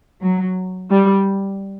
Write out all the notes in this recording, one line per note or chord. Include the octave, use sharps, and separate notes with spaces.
F#3
G3